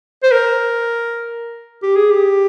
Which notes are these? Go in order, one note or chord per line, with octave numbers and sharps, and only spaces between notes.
C5
A#4
G4
G#4
G4